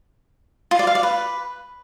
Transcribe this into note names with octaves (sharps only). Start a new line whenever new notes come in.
F4
D5
F5
D5
B4